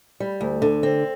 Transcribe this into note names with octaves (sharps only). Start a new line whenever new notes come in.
G3
D2
D3
C4